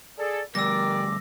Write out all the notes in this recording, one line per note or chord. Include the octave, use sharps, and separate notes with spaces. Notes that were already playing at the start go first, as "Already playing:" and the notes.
G#4 A4 D5
D2 G2 G4 A#4 D5 D6 E6 A#6